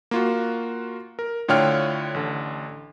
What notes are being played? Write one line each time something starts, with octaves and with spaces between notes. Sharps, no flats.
A#3 F4 F#4
A#4
A2 D3 F4 C#5 G5 F6
A1 D3